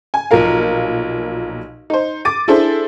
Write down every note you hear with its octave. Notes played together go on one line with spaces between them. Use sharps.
G#5
B1 A#2 F3 A#4 F5
D#4 C5
D6 A6 D#7
D4 E4 G#4 A4 C5 E5